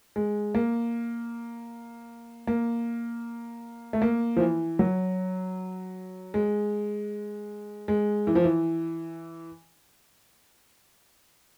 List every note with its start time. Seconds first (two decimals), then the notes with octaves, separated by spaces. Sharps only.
0.16 G#3
0.55 A#3
2.47 A#3
3.93 A3
4.02 A#3
4.37 F3
4.40 E3
4.79 F#3
6.34 G#3
7.88 G#3
8.27 E3
8.35 F3
8.44 E3